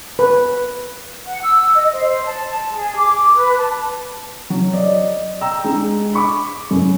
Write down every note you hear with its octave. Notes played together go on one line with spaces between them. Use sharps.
B4
F#5
E6
D#5
C5
A5
G#4
D6
B4
A5
F#3
D5 D#5
G5 A#5 E6
G#3 D4
B5 C#6 D6
F#2